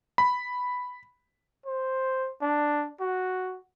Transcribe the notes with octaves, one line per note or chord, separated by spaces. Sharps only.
B5
C5
D4
F#4